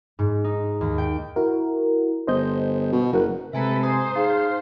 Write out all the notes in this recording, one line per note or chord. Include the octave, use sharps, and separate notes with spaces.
G#2
D#4
D#2
G5
E4 F#4 A#4
G1 C5 D#5 G6
B2
F#1 F#4 A#4 F#5
C3 G#3 A4 B4 E5 G#5 A#5
C5 G#5 A#5 D#6
D#4 G#4 F5